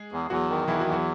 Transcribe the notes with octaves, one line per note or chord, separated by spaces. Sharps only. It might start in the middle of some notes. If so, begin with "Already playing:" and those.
Already playing: G#3 G#4
E2
E2 F#3 F#4
D#3
E2 E3 E4
F#3 F#4
E2
F#3 F#4